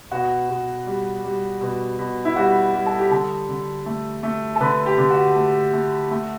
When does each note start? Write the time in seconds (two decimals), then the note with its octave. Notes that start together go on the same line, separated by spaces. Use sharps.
0.11 B2 F#4
0.49 B2
0.87 G3
1.24 G3
1.61 B2
1.99 B2
2.25 E4
2.36 G3 F#4
2.74 G3
2.86 A4
2.99 G4
3.11 D3 A4
3.49 D3
3.86 A3
4.23 A3
4.56 A4
4.61 D3 B4
4.86 G4
4.98 D3
5.11 F#4
5.36 A3
5.73 A3
6.11 A3